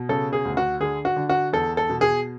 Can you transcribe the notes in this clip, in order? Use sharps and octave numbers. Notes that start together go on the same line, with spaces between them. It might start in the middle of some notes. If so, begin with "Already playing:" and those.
Already playing: B2
C#3 A4
G#4
D2
F#4
D3 G#4
F#4
D3
F#4
E2 A4
A4
B2
G#4